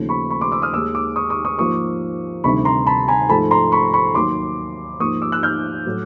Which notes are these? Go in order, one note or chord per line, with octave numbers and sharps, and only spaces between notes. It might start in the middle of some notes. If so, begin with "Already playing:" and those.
Already playing: D#2 C#3 F3 A3
B5 C#6
B5 C#6
C6 D6
D6 E6
D#6 F6
D#2 D#3 G#3 D6 E6
D6 E6
C#6 D#6
C#6 D#6
C#6 D#6
G#2 F3 A#3 C#6 D#6
D2 C3 D#3 G3 B5 C#6
A#5 C6
A5 B5
G#5 A#5
G#2 F3 A3 A5 B5
A#5 C6
B5 C#6
B5 C#6
D#2 D#3 F#3 A#3 C6 D6
G#2 F3 A#3 C#6 D#6
D6 E6
E6 F#6
F6 G6
A2 F#3 A3